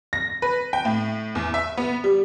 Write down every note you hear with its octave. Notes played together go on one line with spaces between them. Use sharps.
A#6
B4
G5
A2
E2
E5
B3
G3